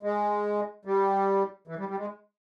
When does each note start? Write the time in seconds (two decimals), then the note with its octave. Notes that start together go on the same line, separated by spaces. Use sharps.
0.03 G#3
0.85 G3
1.68 E3
1.78 G3
1.89 G3
1.99 G#3